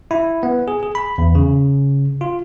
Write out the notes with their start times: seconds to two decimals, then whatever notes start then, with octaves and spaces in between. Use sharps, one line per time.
0.11 E4
0.43 B3
0.68 G#4
0.83 G#4
0.95 B5
1.18 E2
1.35 C#3
2.21 F4